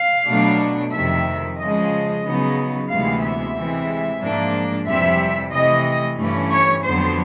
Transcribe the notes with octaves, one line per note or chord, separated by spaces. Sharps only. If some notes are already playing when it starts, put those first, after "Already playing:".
Already playing: F5
B2 F#3 A3 D4
F2 C3 D#3 E5
C#3 F3 G#3 D#5
C#3 F#3 B3 D#4
D2 C3 E3 G#3 B3 F5
E5
C3 E3 G#3
G#2 F3 A#3 D4
F2 C3 E3 G3 C4 E5
C3 E3 A3 D#5
G2 E3 A3 C#4
C#5
F2 D3 F#3 B3 C5